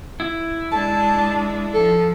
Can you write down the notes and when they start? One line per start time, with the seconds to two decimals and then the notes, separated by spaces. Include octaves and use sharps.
0.20 E4
0.72 G#3 D4 A5
1.74 F3 A4